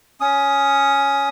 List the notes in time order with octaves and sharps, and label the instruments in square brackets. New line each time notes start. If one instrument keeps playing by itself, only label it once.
[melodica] C#4 D#6